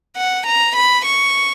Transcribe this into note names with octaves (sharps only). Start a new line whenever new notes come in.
F#5
A#5
B5
C#6